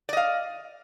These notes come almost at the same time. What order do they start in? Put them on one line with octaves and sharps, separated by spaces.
D5 D#5 F5